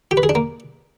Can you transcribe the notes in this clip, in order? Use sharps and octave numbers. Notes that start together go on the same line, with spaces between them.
G4
B4
G#4
D4
A#3